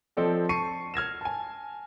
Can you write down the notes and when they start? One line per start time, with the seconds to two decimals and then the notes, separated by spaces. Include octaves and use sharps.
0.17 F3 C4 A4 D5 D#5
0.49 A5 C#6 C7 C#7 D#7
0.94 F6 G#6 A#6 E7
1.21 G#5 A5